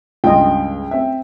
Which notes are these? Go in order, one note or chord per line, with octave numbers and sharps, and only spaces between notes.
C#2 G2 F4 D#5 G5
C4 E5